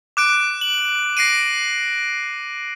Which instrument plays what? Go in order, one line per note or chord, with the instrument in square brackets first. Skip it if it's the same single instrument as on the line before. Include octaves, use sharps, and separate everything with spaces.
[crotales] D6 F#6 D7
F#7
A#6 C7 D7 D#7